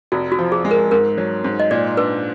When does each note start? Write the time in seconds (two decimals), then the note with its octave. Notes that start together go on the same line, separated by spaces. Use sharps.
0.12 F1 F#4
0.32 F#4
0.39 F3
0.52 G#4
0.65 G#3
0.71 A#4
0.91 G#2 A#4
1.18 F#3
1.44 G#2
1.60 D#5
1.71 A#2 D5
1.97 D4 B4